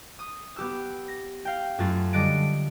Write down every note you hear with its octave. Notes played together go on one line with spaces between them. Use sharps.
D#6
B3 G4 E6
A#6
F5 G5
F#2 A3 F4 A6
D3 G3 D#5 F#6 A6 D7